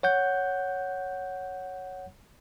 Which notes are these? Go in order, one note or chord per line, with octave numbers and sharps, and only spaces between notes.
C#5 F#5 G6